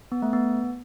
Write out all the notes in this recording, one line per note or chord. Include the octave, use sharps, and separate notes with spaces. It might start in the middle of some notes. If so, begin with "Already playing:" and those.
B3
A3
B3